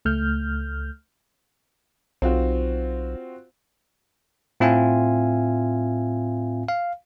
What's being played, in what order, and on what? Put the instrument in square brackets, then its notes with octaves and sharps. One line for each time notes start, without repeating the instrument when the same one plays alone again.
[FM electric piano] C#2 A3 F6 G6
[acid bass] B1 [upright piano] C4 F4 F#4
[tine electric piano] A2 C4 F4 E5 F5 G#5
F5